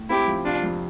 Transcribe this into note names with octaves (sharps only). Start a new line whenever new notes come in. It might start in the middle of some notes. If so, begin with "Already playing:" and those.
Already playing: A2
C4 E4 G4
F3
C3 D4 F4
F2